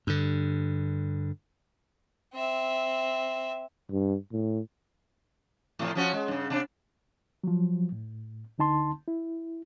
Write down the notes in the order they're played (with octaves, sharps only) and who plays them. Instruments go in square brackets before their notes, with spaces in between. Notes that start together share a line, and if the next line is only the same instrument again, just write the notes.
[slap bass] G2 D3
[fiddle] C4 E5
[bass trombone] G2
A2
[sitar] A2 C3 F3
F3 C#4 F#4
G#3
G2 C#3
C3 D4
[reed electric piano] F3 F#3
A2
D2 D3 D#4 A5 C6
E4